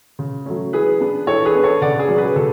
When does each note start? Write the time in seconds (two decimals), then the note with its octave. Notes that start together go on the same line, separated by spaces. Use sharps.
0.19 C#3
0.46 F#3 A3 C#4
0.73 E3 G#4 B4
1.00 B3 D4
1.27 E3 A4 C#5
1.45 G#4 B4
1.55 B3 D4
1.64 A4 C#5
1.82 C#3 D5 F#5
2.00 G#4
2.09 F#3 C#4
2.17 G#4 B4
2.36 C#3 A4